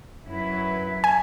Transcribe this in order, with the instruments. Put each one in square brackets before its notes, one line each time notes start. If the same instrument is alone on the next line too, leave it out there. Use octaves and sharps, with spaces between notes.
[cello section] F#2 F#3 E4 B4
[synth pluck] G#5